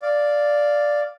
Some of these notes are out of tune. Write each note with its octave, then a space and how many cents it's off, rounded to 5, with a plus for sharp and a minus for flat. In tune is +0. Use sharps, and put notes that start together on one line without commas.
D5 +0 F5 +0